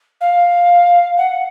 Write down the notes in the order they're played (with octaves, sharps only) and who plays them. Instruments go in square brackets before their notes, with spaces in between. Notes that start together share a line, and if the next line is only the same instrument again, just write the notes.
[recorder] F5
F#5